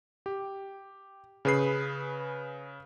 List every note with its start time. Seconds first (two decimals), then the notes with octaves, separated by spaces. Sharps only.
0.26 G4
1.45 C#3 G#4 B4 B5 C7